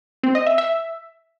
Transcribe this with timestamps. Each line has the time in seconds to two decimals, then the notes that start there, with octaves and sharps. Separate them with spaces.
0.23 C4
0.35 D#5
0.47 E5
0.58 E5